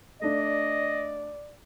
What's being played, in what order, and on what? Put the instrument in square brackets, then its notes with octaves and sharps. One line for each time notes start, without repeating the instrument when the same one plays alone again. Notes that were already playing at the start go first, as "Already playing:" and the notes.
[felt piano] A3 D4 [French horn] D5 [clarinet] D#5